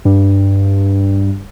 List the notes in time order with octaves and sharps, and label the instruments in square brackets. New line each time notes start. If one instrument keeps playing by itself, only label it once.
[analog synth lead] G2